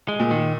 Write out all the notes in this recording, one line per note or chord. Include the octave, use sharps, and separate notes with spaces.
G#3
A#2
D#3